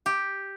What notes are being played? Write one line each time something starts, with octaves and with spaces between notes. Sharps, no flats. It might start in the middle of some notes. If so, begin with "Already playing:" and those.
G4